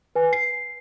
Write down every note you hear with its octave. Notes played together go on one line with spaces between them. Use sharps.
B4 G#5
C7